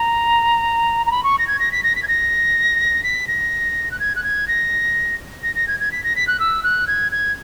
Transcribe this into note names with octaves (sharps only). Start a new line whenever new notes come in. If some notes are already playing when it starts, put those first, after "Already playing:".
Already playing: A#5
A#5
B5
C#6
A#6
G#6
A#6
B6
A#6
B6
G#6
A#6
B6
A#6
F#6
G#6
F#6
G#6
A#6
A#6
A#6
G#6
G#6
B6
A#6
B6
F#6
E6
F#6
G#6
G#6